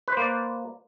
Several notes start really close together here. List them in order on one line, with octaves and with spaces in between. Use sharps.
B4 C5 A#3 D5